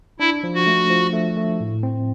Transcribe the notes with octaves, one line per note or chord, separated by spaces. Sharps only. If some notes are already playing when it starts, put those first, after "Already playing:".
D4 E4
F3
F#4
A3
F3
A3
A3
A2
C4